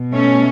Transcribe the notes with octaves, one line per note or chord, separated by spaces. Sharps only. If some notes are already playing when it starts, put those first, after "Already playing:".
Already playing: B2
A3 C#4